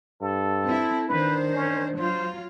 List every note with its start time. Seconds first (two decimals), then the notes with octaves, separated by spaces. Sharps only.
0.21 G2 A4
0.65 C4 E4
1.09 D#3 D4 B4 C5
1.54 C#4
1.97 F#3 F4 C5